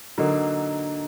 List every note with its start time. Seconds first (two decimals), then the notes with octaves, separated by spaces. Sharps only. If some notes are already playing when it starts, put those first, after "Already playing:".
0.18 D3 F#3 A#3 D#4